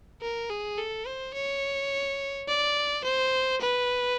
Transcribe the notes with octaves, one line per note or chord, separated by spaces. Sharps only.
A#4
G#4
A4
C5
C#5
D5
C5
B4